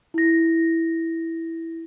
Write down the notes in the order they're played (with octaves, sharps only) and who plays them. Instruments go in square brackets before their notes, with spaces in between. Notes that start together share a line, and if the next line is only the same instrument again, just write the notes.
[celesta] E4 A#6